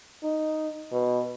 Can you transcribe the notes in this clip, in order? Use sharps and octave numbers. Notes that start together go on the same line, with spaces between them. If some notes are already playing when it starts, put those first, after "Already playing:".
D#4
B2